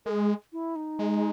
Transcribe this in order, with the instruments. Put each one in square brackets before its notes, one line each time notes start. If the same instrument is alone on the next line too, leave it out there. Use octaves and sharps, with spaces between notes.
[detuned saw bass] G#3 [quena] G#4 A#4
[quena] E4
D#4
[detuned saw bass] G#3